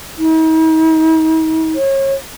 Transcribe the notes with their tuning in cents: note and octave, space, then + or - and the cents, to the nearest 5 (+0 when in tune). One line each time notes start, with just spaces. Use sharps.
D#4 +45
C#5 -30